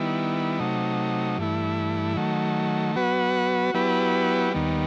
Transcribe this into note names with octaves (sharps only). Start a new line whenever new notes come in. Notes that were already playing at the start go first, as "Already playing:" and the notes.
Already playing: D#3 G3 B3 E4
C3 F#3 A3 D#4
G2 E3 A3 E4
D#3 F#3 A3
F#3 B3 F#4 B4
F#3 B3 E4 G4 B4
D#2 D#3 G3 B3